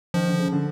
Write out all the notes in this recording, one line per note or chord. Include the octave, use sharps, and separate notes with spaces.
D#3 F3
D3
C#3
D3